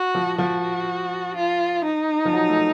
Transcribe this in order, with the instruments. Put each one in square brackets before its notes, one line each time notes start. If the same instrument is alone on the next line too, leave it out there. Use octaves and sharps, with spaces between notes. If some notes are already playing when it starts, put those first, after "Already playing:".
Already playing: [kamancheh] F#4
[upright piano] F3
[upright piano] F3 [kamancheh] F#4
[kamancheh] F4
D#4
[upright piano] F3
F#3
A3